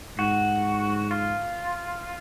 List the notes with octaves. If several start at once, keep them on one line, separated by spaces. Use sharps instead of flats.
G#2 F#4
F4